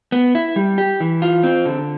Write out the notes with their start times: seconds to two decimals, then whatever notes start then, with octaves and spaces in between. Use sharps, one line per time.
0.12 B3
0.35 E4
0.56 G3
0.78 G4
1.00 E3
1.22 F4
1.43 C4
1.66 D3